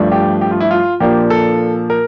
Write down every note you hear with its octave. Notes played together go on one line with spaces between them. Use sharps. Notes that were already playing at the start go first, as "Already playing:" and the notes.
Already playing: G2 F3 A3 D4
G4
G4
F4
E4
F4
A#2 F3 A#3 D4 G4
A4
A#4